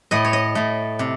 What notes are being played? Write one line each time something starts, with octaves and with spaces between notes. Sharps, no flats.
A2 A3 D#5
C#5
D#5
A2 A3
C3